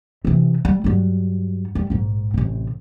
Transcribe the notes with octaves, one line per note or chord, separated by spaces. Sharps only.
C3 E3
G3
G2 F#3
G3
A#1 G#2
A1 C3